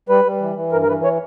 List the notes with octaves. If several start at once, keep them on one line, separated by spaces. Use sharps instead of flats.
G3 B4
G3
E3
E3
G2 A#4
A#4
E3 B4
C#5